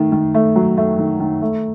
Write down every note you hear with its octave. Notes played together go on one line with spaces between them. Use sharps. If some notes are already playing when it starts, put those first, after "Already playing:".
Already playing: D#3 A3
D#3
A3
F#3
A3
D#3
D#3
A3